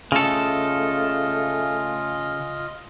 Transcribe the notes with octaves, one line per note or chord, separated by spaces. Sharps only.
C#3 A3 F4 A4 D#5 F6